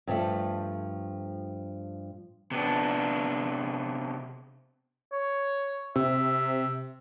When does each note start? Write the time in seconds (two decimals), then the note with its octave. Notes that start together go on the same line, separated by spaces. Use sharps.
0.07 G2 F3 A3
2.51 C3 B3 D4
5.12 C#5
5.96 C3 E5